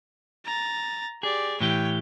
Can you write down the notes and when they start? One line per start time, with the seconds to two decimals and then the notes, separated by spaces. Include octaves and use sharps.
0.45 A#5 A6
1.23 G4 G#4 D5
1.60 A2 E3 G4 C#5 G5